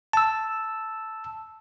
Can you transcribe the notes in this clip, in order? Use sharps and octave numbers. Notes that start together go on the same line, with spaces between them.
A5 E6